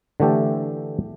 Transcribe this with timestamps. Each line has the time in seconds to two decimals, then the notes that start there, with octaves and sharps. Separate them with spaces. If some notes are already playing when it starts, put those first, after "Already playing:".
0.20 D3 E3 A3 G4 A4